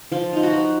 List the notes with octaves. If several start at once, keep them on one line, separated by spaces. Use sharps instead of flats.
F3 F4
D#4 F4
F#4
F3